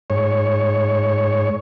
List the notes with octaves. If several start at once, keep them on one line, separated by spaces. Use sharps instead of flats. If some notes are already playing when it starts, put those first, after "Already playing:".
G#2 C#5